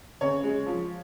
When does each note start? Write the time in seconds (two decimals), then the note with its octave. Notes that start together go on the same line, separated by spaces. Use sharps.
0.21 C#3 C#5
0.43 G#3
0.66 F3